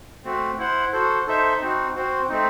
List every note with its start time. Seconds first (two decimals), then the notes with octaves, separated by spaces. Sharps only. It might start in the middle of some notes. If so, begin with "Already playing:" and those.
0.24 A3 C4 F#4
0.58 E4 C5 F#5
0.92 F#4 A4 C5
1.27 D#4 A4 C5 E5
1.61 C4 D#4 F#4
1.94 C4 F#4 C5
2.29 A3 C4 D#4